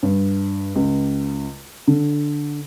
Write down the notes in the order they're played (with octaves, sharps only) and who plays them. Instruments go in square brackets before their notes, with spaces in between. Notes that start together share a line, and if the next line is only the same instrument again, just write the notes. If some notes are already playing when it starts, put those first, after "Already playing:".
[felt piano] G2
C#2
D3